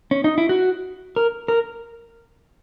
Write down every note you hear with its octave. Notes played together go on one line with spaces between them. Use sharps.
C#4
D#4
E4
F#4
A#4
A#4